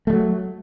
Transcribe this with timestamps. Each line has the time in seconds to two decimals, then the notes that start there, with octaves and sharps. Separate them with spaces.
0.07 A3
0.10 G3
0.13 F#3